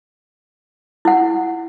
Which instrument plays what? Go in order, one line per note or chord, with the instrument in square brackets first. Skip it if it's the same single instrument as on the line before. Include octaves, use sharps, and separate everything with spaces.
[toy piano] E4 F#5